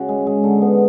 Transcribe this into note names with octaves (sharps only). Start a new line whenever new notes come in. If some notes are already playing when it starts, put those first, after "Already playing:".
Already playing: C#3 F#4
G#3
G#3
D3
B3